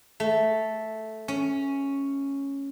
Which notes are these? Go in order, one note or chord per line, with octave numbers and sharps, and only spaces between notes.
A3
C#4